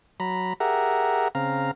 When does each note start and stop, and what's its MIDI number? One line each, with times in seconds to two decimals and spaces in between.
0.20 0.53 54
0.20 0.53 82
0.20 0.53 83
0.60 1.28 67
0.60 1.28 68
0.60 1.28 70
0.60 1.28 76
0.60 1.28 78
0.60 1.28 82
1.35 1.71 49
1.35 1.71 60
1.35 1.71 77
1.35 1.71 82